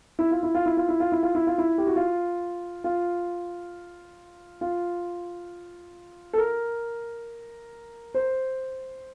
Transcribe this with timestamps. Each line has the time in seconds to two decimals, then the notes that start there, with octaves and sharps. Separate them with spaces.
0.19 E4
0.31 F4
0.43 E4
0.55 F4
0.66 E4
0.77 F4
0.89 E4
1.00 F4
1.12 E4
1.23 F4
1.35 E4
1.47 F4
1.58 E4
1.78 G4
1.87 F#4
1.96 F4
2.84 F4
4.61 F4
6.33 A4
6.38 A#4
8.15 C5